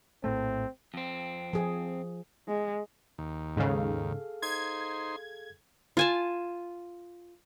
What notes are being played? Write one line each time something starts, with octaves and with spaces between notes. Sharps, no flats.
A#1 A2 A3 C4
F2 C4
F3 G#4
G#3
D#2
G#2 C#3 G#4 A4 F5
D#4 C5 C6 G#6
F4 G#5 A5